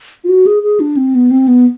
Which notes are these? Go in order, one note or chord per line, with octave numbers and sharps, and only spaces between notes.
F4
F#4
G#4
G#4
D4
C4
B3
C4
B3